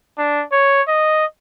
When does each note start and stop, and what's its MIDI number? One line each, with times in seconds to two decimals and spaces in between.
0.18 0.44 62
0.52 0.82 73
0.87 1.25 75